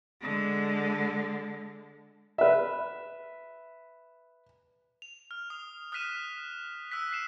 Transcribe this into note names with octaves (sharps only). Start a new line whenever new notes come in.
D3 G#3
B4 E5
F7
F6
D#6
D#6 F6 F#6 B6 D#7 E7
E6 F#6 B6
F#6 C7 E7